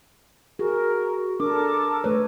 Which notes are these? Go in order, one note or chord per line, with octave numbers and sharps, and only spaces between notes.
F#4 G#4 A#4
D4 A4 A#4 D6
A3 B4 C#5